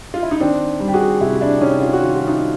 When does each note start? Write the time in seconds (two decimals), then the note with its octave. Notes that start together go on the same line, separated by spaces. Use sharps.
0.14 F4
0.23 E4
0.31 D#4
0.40 D#3 C4 D4
0.80 G3
0.88 G4
0.94 F#4 G#4
1.21 C3 E4 F#4
1.41 D4 E4
1.61 C3 C#4 D#4
1.81 F4
1.93 F#4
2.01 D#3 F4
2.16 F#4
2.27 D#4 F4